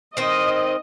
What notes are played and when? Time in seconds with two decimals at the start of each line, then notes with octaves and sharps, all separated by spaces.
0.17 D#3 C4 D#5